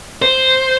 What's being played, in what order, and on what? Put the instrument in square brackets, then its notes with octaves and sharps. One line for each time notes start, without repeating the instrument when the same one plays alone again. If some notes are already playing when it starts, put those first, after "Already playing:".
[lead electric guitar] C5